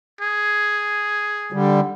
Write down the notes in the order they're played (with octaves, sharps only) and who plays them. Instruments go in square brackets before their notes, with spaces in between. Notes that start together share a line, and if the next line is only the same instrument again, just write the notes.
[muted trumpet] G#4
[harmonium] D3 G3